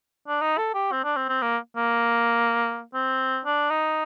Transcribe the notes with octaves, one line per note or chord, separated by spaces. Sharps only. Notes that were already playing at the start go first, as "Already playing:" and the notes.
D4
D#4
A4
G4
C4
D4
C4
C4
A#3
A#3
C4
D4
D#4